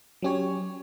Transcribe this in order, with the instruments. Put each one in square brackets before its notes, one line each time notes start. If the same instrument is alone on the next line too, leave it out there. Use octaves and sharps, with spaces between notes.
[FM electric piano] F#3 C#4 G4 C#5